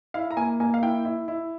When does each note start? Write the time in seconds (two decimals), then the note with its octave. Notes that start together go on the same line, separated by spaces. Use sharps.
0.14 E4 F5
0.31 A#5
0.37 A#3 G#5
0.60 A#3 G#5
0.74 F5
0.82 E4 G5
1.05 E4
1.28 E4